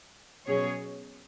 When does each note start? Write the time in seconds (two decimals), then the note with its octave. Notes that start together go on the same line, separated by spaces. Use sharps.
0.45 B2 F#3 C#4 G#4 C#5